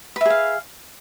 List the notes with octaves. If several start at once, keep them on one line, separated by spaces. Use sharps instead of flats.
G#4 B4 E5 F5